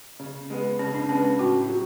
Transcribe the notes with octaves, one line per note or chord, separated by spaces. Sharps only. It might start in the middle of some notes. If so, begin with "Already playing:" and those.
C#3
G#3 B3
C#3 C#4
D4
G#3 B3 C#4
C#4
A2 F#4
F#3